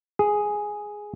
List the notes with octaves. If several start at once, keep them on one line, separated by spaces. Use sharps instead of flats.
G#4